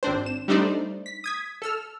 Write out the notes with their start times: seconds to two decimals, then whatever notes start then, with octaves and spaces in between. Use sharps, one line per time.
0.03 G#1 C4 D4 C5
0.26 E7
0.48 G3 A3 D4 D#4 C5 D5
1.06 B6
1.24 D#6 G#6 B6
1.62 A4 E6 F6